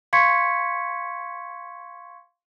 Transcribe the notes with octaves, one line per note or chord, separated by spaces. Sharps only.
F5 C6 C#6 G#6 B6 C#7